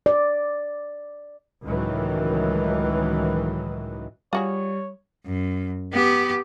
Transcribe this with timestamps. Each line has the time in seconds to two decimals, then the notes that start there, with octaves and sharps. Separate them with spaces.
0.06 D5
1.64 C#2 A2 D#3 E3 F#3
4.33 G3 F4 F#4 G#4 C#5
5.26 F#2
5.93 B3 G4